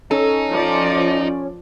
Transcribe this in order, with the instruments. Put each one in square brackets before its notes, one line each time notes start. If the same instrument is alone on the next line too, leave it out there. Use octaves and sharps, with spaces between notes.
[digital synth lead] C#4 [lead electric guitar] D#4 [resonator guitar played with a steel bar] A4
[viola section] F3 D5